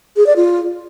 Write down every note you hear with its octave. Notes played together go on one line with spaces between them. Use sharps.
G#4
D5
F4